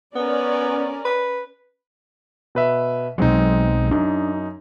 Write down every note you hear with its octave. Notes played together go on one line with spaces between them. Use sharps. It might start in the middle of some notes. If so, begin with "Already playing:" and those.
B3 C#4 A#4 D5
B4
B2 B4 E5
B1 F#3 G#3 C4 D#4
F#2 D4 D#4